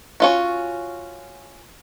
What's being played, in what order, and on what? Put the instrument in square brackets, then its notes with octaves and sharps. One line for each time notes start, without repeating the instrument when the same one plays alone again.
[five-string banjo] C#4 F4 F#4